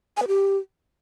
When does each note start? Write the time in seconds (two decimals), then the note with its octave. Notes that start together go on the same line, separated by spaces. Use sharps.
0.17 G#5
0.22 B4
0.28 G4